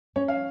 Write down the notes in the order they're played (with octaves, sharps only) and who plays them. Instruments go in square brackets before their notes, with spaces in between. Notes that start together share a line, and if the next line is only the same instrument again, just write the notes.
[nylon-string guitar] C#4 [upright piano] C#5
[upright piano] F5